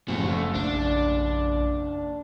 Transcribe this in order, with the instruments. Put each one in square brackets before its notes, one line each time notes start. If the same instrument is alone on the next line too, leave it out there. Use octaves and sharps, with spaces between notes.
[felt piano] F#1 D#2 [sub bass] F3 [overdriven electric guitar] A3 F#4
[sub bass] A#1 [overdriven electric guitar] D4